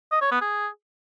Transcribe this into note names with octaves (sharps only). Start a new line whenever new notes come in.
D#5
C#5
B3
G#4